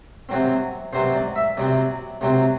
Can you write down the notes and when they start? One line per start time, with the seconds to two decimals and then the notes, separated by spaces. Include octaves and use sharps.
0.29 C3 F#3 C4
0.93 C3 F#3 C4 C5
1.14 D5
1.36 E5
1.57 C3 F#3 C4 D5
2.21 C3 F#3 C4